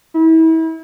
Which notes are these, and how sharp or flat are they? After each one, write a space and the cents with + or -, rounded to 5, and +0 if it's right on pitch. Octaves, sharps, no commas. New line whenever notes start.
E4 -35